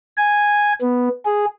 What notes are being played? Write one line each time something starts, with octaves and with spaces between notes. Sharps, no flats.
G#5
B3
G#4